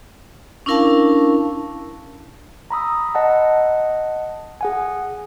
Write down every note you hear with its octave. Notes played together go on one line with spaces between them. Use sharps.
C#4 D4 E4 A#4 F5 A5
A#5 B5 D#6 E6
D#5 F#5 A5
G#4 F#5 G#5